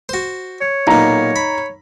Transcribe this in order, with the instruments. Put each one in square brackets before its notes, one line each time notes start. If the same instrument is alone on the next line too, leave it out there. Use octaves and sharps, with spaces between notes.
[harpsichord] F#4 C5
[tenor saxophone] C#5
[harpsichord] B1 A#2 [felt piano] D#4 A#5
[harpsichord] B5